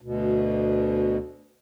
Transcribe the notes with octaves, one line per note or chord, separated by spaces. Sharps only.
D2 B2